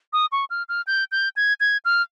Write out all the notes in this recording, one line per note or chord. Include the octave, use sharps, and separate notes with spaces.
D#6
C#6
F6
F6
G6
G6
G#6
G#6
F6